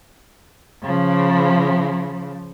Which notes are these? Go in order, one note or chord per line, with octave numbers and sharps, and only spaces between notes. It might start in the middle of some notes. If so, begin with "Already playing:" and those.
C#3 F3